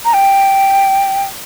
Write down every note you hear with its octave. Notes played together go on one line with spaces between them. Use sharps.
A#5
G5